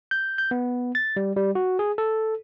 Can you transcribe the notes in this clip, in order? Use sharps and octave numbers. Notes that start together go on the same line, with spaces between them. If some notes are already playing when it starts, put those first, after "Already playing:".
G6
G6
B3
A6
G3
G3
F#4
G#4
A4